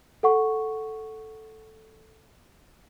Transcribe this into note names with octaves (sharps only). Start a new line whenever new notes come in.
A4 F#5 C#6